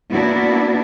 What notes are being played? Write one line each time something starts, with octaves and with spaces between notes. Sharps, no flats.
A#3 B3 D4 E4 F#4